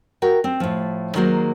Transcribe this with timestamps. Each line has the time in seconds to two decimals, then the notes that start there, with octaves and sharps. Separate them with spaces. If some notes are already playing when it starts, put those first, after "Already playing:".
0.22 F#4 A#4 G5
0.44 C4
0.60 A2 F3
1.15 D#3 F#3 G#3 A#3 C5